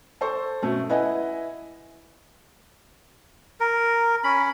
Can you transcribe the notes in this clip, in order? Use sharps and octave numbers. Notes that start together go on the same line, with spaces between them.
A4 C5 C#6
B2 A3 C#4
E4 B4 D#5 F#5 G#5
A#4
C#4 B5